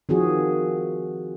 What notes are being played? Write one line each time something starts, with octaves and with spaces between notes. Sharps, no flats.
D#3 F3 C4 F#4 G#4